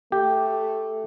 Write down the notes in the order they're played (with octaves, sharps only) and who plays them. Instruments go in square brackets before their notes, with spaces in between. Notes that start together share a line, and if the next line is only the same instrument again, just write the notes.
[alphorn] A3 [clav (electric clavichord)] G4